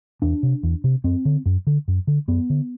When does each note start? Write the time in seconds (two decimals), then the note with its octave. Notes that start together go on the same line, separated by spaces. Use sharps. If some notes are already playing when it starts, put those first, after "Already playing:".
0.22 E2 D4
0.43 C3
0.63 E2
0.84 C3
1.04 F#2 C4
1.25 D3
1.46 F#2
1.67 D3
1.88 F#2
2.07 D3
2.28 F#2 B3
2.50 D3